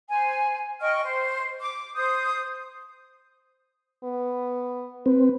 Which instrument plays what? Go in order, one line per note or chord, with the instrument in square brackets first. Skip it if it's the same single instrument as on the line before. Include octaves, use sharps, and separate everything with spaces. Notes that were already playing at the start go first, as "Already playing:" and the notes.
[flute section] C5 G#5
D#5 G5 C#6 F6
C5
D6
C5 D#6 G6
[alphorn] B3
[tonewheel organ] C4 [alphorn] B4